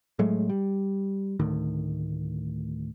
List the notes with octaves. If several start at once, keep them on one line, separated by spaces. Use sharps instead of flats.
A2 F#3 G#3 A3
G3
D2 A2 D#3